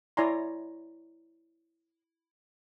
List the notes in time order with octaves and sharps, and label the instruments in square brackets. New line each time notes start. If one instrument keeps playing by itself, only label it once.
[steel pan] E4 C#5 D5 G#5 A#5 C6